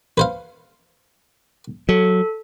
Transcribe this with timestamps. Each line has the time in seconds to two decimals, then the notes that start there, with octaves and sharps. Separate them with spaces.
0.18 B4 C5 F5
1.89 F#3 A4